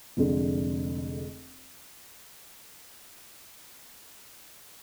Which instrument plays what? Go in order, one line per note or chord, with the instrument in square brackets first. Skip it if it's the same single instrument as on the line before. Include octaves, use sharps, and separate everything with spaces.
[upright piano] F1 F2 D3 G#3